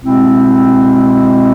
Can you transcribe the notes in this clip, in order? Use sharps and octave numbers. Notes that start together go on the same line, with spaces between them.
B2 G#3 C4 E4